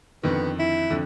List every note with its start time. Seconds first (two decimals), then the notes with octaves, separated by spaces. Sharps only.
0.23 F2 D3 D#3 B3
0.59 E4
0.90 F2 D3